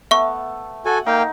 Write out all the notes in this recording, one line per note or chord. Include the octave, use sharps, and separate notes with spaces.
A3 B3 E5 C#6
F#4 A4 F#5 G#5
A#3 D#4 F5 G5